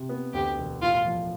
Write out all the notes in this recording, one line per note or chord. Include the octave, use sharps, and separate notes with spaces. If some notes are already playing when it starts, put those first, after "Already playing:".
Already playing: C3
B3
D2 G4
E1
A2 F4
F3